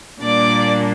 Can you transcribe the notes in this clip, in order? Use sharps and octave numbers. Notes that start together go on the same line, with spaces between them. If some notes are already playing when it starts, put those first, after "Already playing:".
A#2 G3 A#3 D4 D5 D6